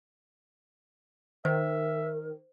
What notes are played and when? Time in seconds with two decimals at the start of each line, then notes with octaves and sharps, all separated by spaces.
1.45 D#3 A#4 C5 E5